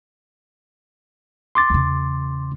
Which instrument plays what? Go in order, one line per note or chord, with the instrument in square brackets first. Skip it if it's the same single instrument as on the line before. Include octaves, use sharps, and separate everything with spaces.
[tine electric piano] C6 D6 A6
[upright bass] E2 C#3